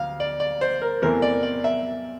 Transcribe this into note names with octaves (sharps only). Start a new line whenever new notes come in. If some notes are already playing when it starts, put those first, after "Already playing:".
Already playing: D2 F5
D5
D5
C5
A#4
E2 C3 E3 A3 C4 A#4
D5
D5
E5